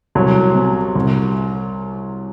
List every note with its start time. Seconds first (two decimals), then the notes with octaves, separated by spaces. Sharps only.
0.15 C2 F#3
0.55 C3
0.95 C2